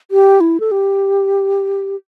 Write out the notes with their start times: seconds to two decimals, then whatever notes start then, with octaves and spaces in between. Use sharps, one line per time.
0.11 G4
0.40 E4
0.60 A4
0.71 G4